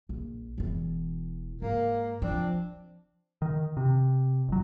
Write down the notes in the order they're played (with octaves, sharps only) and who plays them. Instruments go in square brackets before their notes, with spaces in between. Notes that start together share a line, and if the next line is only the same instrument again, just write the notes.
[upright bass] A#1
E1 E3
[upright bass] G#2 [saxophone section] A#3
[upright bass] F3 [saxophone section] C4 D4
[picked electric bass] D#3
C3
G1 F#3